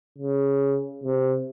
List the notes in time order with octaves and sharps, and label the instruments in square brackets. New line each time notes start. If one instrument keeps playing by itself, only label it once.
[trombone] C#3
C3